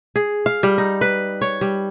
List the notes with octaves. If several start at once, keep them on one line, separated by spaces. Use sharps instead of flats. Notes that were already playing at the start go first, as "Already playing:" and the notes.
G#4
F5
G3
D#4
B4
C#5
G3